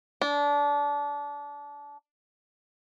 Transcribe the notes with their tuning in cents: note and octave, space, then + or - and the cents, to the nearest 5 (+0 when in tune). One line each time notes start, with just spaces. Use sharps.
D4 -25